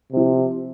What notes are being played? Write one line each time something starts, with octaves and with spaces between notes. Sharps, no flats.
C3 F3 C4